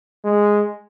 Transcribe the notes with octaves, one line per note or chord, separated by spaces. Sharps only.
G#3